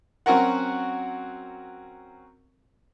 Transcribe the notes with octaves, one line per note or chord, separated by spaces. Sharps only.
F#3 C4 C#4 F#4 A#4 F#5